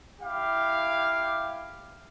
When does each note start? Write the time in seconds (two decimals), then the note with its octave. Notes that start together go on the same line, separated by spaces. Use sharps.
0.21 E4 G4 F5